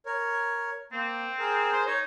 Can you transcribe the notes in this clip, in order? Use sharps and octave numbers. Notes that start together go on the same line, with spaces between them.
A#4 C#5
A#3 C4
G#4 A#4
C5
D#4 C#5